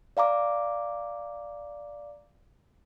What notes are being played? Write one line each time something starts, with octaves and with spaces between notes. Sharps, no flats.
D5 F5 A#5 D6